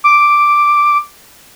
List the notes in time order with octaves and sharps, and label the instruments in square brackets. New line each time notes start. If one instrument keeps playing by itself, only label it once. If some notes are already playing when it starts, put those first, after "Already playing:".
[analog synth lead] D6